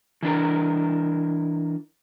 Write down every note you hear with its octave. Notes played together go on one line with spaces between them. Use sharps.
E3 D4 A#4